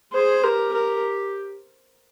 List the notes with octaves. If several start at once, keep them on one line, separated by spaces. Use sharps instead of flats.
G#4 C5
G4 A#4
A#4